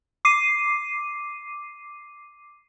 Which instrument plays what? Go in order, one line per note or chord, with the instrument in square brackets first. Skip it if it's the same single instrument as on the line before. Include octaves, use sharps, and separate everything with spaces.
[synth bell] D6 C7 D#7